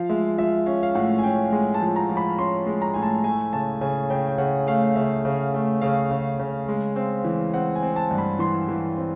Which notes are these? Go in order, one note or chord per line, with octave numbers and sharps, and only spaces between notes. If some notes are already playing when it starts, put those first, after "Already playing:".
Already playing: F3 F5
G#3 E5
F3 E5
C#4 F5
F5
A2 F#5
G#5
C#4 G5
G#3 G#5
A5
F3
A#5
F3
B5
C#4 C6
G#3
A#5
A2 G#5
A5
A3 G#5
C#3 A5
C#3 G#5
C#3 G5
G5
C#3 F#5
A3 F5
C#3 E5
C#3
A3
C#3 F5
C#3
C#3
G#3
C4
E3
C4 F#5
G#5
C4
A5
G2
B5
E3 C6
E3
C4